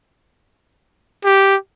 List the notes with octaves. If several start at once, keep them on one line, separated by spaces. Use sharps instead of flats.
G4